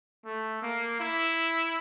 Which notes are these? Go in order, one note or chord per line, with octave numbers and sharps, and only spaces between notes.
A3
A#3
E4